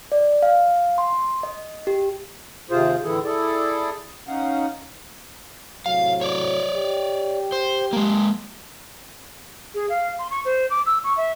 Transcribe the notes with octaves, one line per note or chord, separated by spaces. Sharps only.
D5
F5
C6
D#5
G4
D#2 C3 F4 G#4 C5
A2 D3 E3 E4 G#4 A4
E4 G#4 A4 D5
C#4 D#4 F5 F#5
A2 C3 F#3 F5
C#5 D5
G4
C5
G#3 A#3
G#4
F5
C6
C#6
C5
D6
E6
C#6
E5